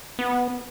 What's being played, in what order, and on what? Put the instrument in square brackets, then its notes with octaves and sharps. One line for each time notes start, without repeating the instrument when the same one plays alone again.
[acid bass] B3